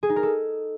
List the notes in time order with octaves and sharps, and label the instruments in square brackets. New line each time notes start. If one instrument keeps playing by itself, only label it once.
[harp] G#4
D#4
A#4
A4